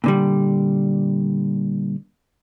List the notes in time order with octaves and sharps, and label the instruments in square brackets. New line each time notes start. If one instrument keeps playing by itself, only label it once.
[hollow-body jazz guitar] A#2 D3 G3